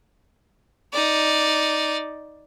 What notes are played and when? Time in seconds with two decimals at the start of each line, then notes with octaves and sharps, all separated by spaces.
0.93 D#4 D5